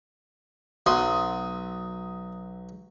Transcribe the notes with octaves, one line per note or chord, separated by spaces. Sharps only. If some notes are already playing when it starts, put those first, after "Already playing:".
B1 F#3 C6 D#6